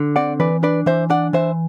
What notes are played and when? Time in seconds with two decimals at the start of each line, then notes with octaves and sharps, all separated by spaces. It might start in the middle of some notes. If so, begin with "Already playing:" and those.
Already playing: D3
0.16 C4 D5 F#5
0.40 E3 B4 D5
0.63 D4 B4 D5
0.86 E3 C5 E5
1.10 D4 D5 F#5
1.33 E3 C5 E5